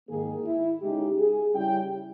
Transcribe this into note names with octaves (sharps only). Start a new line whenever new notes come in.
G#2 D#3 A#3 G#4
E4
C#3 G#3 D#4 G4
G#4
C#3 G3 C#4 E4 G5